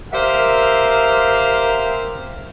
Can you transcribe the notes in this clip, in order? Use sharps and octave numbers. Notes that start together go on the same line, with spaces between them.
G4 A#4 C5 E5 F5